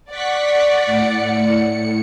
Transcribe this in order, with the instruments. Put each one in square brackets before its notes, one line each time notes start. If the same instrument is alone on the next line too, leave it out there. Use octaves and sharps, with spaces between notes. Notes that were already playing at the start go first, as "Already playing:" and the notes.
[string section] D5 F#5 [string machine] C#6 F#6 B6
[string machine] A2 C#7